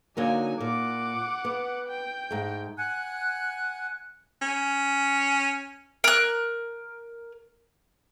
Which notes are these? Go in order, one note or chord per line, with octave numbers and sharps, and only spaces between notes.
D3 F#3 A#3 D#4 G#5
A#2 F#5 D6
B3
G5
G#2 A3
F#5 G#5 F#6
C#4
A#4 F#6